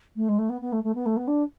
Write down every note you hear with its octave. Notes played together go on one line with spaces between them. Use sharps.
A3
G#3
A3
B3
B3
A3
A3
B3
A3
B3
D4